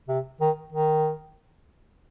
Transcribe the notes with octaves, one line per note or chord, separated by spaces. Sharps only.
C3
D#3
D#3